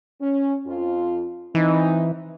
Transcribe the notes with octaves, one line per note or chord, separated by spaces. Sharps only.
C#4
F2 F4
E3 C4 D#4